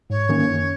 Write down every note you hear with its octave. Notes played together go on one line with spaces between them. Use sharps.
G#2 C#5
D#3 A#3 C#4
F#2